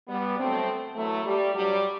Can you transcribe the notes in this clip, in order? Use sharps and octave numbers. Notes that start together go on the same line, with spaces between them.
G3 B3
D2 D3 F#3 A3 C4
F#2 E3 F#3 A3
G3
G2 F#3 G3